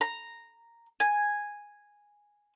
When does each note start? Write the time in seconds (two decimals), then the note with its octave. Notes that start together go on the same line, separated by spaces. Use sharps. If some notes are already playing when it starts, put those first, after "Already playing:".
0.01 A#5
1.00 G#5